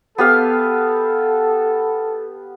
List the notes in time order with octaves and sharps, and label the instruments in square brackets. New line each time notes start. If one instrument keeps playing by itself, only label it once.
[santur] B3 G4 F5 [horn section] A4